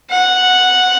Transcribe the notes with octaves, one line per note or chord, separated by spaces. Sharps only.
F#5